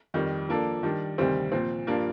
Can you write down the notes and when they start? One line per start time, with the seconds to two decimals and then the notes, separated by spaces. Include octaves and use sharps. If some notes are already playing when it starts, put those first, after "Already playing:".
0.14 F2 D#3 G3
0.49 F3 A#3 D4 A4
0.83 D#3 G3 D4
1.18 D2 C3 D#3 G3 C4
1.52 A#2 F3 C4
1.87 G2 F3 A#3 D4